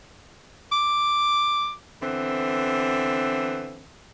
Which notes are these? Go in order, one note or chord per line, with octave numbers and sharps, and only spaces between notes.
D6
D3 E3 B3 C4